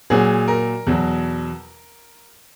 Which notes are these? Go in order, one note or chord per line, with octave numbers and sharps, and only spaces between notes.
A#2 F#3 G#4
A#4
E2 B2 F#3